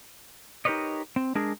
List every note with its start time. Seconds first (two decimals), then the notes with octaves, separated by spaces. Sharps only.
0.65 D#4 G4 A#4 B4 C#5 D#5
1.16 C4
1.35 G#3 D4 G#4 A#4